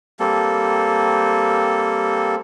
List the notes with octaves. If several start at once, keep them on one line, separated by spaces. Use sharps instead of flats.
G3 A#3 C4 A4